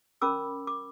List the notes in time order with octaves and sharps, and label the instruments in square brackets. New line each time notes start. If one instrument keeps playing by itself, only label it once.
[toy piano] C#4 A#4 B5 D6 E6
D6